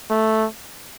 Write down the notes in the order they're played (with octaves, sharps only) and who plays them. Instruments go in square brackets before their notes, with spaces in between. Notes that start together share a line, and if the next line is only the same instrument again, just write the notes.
[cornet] A3